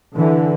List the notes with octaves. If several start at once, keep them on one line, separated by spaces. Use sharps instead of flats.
D3 E3